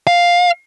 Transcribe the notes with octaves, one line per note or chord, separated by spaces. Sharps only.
F5